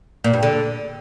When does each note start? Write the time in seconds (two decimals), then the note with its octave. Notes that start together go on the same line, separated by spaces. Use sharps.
0.24 A#2
0.34 G2
0.43 D3